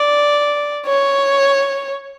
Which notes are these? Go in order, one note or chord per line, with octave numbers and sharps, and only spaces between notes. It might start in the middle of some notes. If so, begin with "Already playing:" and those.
Already playing: D5
C#5